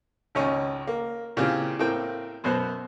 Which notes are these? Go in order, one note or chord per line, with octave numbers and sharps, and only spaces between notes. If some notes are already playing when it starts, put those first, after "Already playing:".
G#1 C#2 C#4 C#5
A#3
A#2 C#3 E3 C4 F4 G4
A2 A#3 C4 G5
F#2 B2 B3 C5 F#6